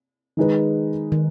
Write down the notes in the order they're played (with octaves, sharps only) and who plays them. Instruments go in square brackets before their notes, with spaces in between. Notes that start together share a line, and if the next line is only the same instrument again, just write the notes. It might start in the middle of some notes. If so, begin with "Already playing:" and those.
[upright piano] D#3 G#3 D#4 G#4 B4
[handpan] D#3